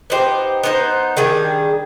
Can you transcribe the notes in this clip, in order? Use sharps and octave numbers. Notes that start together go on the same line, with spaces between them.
B3 D#4 G4 C5
B3 D#4 G4 C5
D#3 G3 D4 G#4